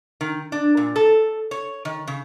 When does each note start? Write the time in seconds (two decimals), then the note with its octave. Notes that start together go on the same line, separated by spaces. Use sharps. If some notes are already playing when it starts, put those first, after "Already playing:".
0.21 D#3
0.52 D4
0.77 A#2
0.96 A4
1.51 C#5
1.85 D#3
2.07 C#3